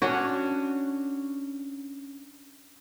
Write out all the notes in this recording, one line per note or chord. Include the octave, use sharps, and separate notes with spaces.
C#4 D4 F#4 C#5